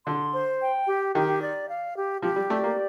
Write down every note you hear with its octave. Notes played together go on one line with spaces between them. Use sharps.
D3 C6
C5
G5
G4
D#3 G4
D5
F5
G4
F3 G4
G3
A3 D5
A#3